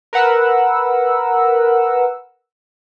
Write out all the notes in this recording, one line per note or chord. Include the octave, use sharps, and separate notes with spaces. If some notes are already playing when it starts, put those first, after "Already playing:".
A#4 B4 F#5 E6